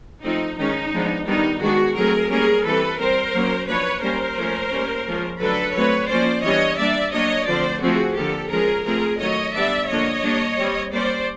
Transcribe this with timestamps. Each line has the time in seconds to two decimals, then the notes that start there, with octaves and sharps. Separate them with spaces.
0.24 F3 A3 C4 D#4
0.58 D#3 G#3 C#4 D#4
0.93 F3 G#3 B3 D4
1.27 D#3 G3 B3 D4 D#4
1.61 D#3 G#3 B3 D4 F#4 G#4
1.96 F#3 A3 C4 G#4 A#4
2.30 G3 A#3 C#4 G#4 A#4
2.65 E3 G3 C4 A4 B4
3.00 G3 C4 A#4 C5
3.34 F#3 A#3 C#4
3.68 F3 A#3 D4 B4 C#5
4.03 G3 A#3 C#4 A#4 C5
4.38 F3 A3 C#4
4.72 G3 A#3 C#4
5.07 F3 G#3 C#4
5.41 D3 F#3 A3 D4 A4 B4
5.76 F#3 A3 C4 B4 C#5
6.10 F3 A#3 C#4 C5 D5
6.45 E3 G3 B3 D4 C#5 D#5
6.79 G3 A#3 D4 D5 E5
7.13 F#3 A#3 D4 C#5 D#5
7.48 D3 F3 A3 C4 C5 D5
7.82 F3 A3 C4 F#4 G#4
8.17 D3 F3 A#3 G4 A4
8.51 F3 G#3 C#4 G#4 A#4
8.86 F3 A3 C4 G#4 A#4
9.20 D#3 F#3 A3 C#5 D#5
9.54 G3 B3 D4 D5 E5
9.89 D3 F3 A#3 D4 C#5 D#5
10.24 G3 A#3 D4
10.58 G3 C4
10.93 G3 A#3 C#4 C5 D5